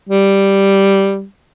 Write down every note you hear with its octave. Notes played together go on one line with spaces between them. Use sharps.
G3